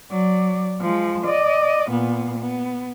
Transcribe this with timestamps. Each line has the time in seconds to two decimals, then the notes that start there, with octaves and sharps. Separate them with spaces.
0.11 F#3 D5
0.81 F3 G#3
1.25 D5 D#5
1.90 A#2 B3
2.39 B3